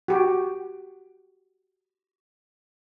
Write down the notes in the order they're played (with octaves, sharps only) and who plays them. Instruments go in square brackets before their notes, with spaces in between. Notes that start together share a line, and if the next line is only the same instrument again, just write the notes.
[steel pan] F#4 G4